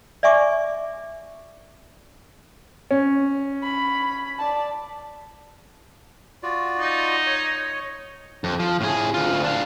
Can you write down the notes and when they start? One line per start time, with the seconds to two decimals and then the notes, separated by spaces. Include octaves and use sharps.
0.23 D5 E5 G#5 C#6 D6
2.91 C#4
3.63 B5
4.39 D5 A5
6.43 F4 F#4 D5
6.79 D#4
7.26 C#5
8.44 F2
8.59 F3
8.81 A2 G#4
9.14 D2 F4
9.44 D4 F5